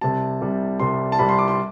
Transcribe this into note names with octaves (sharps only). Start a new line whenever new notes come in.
C2 C3 G3 A5
C2 C3 G3
C2 C3 G3 C6
A5
C2 C3 G3 B5
C6
D6
C6